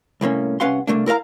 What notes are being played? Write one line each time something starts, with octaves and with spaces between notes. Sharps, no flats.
C2 A2 A#3 C#4
C2 C#4 B4 F5 F#5 C6
C2 A3 A#3 D4
E4 A#4 C5 F5 A#5